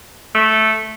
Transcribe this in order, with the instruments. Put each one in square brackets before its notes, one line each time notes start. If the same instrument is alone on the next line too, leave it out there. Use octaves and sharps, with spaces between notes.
[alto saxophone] A3